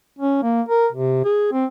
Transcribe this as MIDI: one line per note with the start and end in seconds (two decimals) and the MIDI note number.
0.19 0.39 61
0.43 0.62 58
0.68 0.88 70
0.92 1.24 48
1.25 1.51 68
1.52 1.66 60